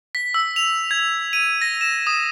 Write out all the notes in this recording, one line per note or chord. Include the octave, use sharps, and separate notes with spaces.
B6
E6
F7
G#6
D#7
A#6
E7
D#6